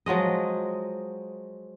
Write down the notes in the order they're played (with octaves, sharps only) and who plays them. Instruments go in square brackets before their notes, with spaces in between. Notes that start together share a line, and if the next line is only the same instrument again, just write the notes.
[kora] F3 F#3 G#3 D#5